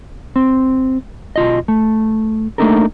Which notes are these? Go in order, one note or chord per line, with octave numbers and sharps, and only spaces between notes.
C4
B1 F4 D#5
A3
A3 A#3 D4 D#4 A4 A#4